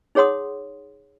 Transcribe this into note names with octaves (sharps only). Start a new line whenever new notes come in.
D#4 G#4 C#5 F#5 C6 D#6